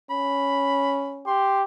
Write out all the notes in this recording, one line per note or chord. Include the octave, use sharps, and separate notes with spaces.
C#4 B5
G4 C6